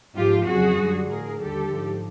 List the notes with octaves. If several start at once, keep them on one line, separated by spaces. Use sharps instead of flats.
G#2 F3 F4 G4
F2 C#3 F#3 F#4 G#4
F#2 D3 G3
A2 F3 G#4 A#4
D#2 D3 G3 G4 A4
G#2 F3